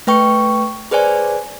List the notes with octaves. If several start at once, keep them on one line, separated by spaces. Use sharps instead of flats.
A3 B4 G5 C#6
G#4 B4 C5 D5 G#5